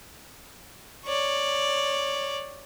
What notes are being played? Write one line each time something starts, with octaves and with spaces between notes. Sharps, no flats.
C#5 D5